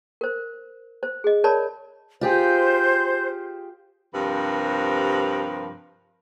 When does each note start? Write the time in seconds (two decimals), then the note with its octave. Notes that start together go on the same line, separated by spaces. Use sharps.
0.21 A#4 C5
1.03 C5
1.24 G#4 D#5
1.44 A#4 C#5 D5 A5 B5
2.21 F4 G4 G#4 C5 G6
4.14 G2 C3 F3 A#4 B4